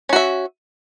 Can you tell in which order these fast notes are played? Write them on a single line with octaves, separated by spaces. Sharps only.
C#4 F#4 E5